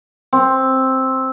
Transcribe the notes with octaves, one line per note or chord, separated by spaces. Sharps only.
C4